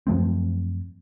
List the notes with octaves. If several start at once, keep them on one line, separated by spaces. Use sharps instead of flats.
F#2 F3 A3 C4